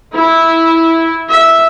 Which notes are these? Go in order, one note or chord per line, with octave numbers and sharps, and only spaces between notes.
E4
E5